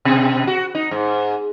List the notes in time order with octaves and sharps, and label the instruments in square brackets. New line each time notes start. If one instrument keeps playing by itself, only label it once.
[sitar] B2
F#4
D#4
G#2